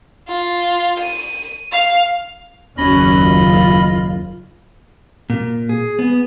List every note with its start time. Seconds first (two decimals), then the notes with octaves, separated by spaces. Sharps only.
0.28 F4
0.99 D#7
1.72 F5
2.77 F#1 D#2 C#4 F#4 D#5 B5
3.22 F4
5.30 A#2
5.69 G#4
5.99 B3